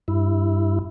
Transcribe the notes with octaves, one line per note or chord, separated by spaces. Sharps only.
G2 E4